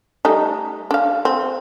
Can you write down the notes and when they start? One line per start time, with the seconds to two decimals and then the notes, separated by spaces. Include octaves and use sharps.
0.25 G3 A3 D#4
0.91 D4 F5
1.25 C4